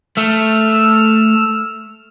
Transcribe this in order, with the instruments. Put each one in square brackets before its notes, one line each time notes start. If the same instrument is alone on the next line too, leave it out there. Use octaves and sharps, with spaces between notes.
[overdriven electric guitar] A3 [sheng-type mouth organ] E6 F6